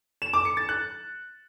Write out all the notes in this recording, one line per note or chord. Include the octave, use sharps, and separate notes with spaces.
E7
D6
C#7
A6
F#6